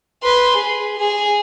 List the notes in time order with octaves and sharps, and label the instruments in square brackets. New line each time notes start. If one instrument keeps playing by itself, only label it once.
[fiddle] B4 C6
G#4
G#4